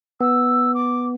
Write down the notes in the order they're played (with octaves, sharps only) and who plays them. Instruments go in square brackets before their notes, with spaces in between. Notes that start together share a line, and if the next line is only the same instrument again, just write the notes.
[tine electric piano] B3 [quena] E6
[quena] D6